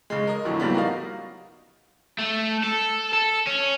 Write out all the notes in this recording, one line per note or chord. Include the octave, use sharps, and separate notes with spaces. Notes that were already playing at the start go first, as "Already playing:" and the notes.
C#3 G#3
A#4 D#5
F2 A2 D3 F#3 A3
A2 C#3 F#3 G3 A#3 B3
D#4 F#4 A#4 D#5 F5
A3
A4
A4
C#4